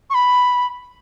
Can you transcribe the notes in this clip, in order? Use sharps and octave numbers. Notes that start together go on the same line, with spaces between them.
C#6
B5